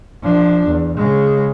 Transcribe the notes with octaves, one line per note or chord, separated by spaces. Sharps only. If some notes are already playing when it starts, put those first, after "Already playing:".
F3 D4
E2
C#3 G#3